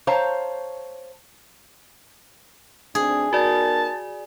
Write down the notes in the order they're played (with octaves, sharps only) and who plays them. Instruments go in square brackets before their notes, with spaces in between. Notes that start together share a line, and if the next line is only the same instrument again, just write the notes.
[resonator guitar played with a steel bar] C5 C#5 F5 A5 A#5
[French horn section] D2 C4 D4 [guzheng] G#4
[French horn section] B3 D#4 A#4 [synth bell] F#4 D5 [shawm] A5